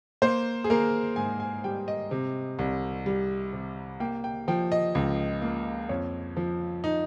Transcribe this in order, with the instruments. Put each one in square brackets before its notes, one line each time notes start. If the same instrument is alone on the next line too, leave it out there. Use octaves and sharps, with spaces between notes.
[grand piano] A#3 C5
G#4
A#3 A#4
G#2 G#5
G#5
G3 G5
D#5
C3
C2
G3
C3
A#3 G5
G5
F3 G5
D#5
C#2
A#3
F2 C#5
F3
D#4